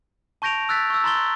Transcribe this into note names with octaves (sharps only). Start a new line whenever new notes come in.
A5 C#6 G6 A#6 D7 F7
E6 F#6 A6 B6
C#6 E6
A#5 C6 A6 G7